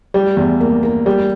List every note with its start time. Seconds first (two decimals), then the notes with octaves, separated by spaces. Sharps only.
0.14 G3
0.37 E2
0.60 A#3
0.83 A#3
1.06 G3